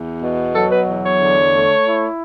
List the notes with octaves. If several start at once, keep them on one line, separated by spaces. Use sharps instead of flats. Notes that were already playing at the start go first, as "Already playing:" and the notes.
Already playing: E2
B2
F#3 A4
B4
E2
C#5
D3
A3
E4